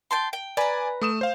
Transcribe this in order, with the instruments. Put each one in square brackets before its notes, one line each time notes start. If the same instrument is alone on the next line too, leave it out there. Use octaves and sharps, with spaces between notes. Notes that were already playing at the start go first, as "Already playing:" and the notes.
[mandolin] G5 A5 C6
G5
[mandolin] B4 A#5 [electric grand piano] D5 G#5
[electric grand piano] A3 D#6 E7
C5 F5